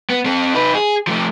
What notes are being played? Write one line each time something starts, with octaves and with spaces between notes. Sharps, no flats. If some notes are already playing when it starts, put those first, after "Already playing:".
B3
C4 A4
D#4 B4
G#4
F3 A3